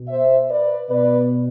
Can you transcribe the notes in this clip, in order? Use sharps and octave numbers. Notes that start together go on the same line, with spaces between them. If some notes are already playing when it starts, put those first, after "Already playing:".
Already playing: B2
C5 E5
B4 D5
B2 B4 D5